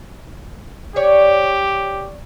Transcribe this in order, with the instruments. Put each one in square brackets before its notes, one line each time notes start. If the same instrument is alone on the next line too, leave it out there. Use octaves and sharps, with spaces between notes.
[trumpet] G4 [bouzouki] C#5 D5